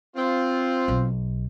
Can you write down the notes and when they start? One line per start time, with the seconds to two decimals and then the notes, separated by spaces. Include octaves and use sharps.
0.16 C4 F4
0.88 B1